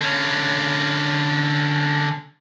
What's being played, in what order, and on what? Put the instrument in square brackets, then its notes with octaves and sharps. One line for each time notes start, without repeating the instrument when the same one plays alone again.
[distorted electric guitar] D3 C#4